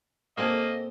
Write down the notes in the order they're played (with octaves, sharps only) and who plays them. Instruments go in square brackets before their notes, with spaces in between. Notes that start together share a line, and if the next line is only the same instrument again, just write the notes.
[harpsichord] A#2 C4 A#5 [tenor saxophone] A#3 [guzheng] G4 A4 G#5 [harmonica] D#5